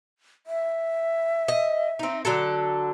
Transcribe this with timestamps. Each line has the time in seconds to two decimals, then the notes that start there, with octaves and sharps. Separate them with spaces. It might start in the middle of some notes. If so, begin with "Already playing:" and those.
0.47 E5
1.48 D#5
1.99 C4 D#4
2.25 D3 F#3 A4